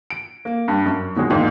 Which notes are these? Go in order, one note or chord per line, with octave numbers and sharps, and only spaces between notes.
D7
A#3
G2
F#2
B2 D#3 F#3 G#3
E1 G#2 A#3